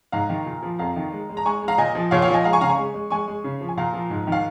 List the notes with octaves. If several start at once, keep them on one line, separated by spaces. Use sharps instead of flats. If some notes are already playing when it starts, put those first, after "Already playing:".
G#2 F5 A#5
D#3
A#2
F3
F2 F5 A#5
D#3
G#3
G#3
A#5
G#3 G#5 C#6
G#3
F5 A#5
A#2 D#5 G#5
F3
A#2 C#5 F5
C#5 F5
F3
D#5 G#5
G#3 F5 A#5
G#5 C#6
C#3 F5 A#5
G#5 C#6
G#3
G#3
G#3 G#5 C#6
G#3
C#3
F3
G#5
A#2 F5 A#5
F3
G#2
D#3
F5